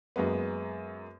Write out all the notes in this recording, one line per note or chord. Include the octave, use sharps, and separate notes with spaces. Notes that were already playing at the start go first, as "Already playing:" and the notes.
F#2 G#3 A#3 B3